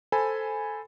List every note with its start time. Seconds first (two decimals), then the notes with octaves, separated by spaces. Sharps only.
0.12 A4 C5 G#5 B5